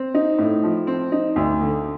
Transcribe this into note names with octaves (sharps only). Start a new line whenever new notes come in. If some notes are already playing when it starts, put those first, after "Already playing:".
Already playing: C4
D#4
A2
F3
C4
D#4
D2
D3